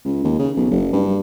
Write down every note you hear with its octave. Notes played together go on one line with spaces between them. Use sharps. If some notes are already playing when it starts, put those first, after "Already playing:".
C#2
D#2
C#3
B1
F#1
G2